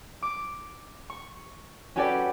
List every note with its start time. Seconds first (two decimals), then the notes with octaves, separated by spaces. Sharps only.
0.22 D6
1.10 C#6
1.96 C#4 F#4 G4 A4 B4 D5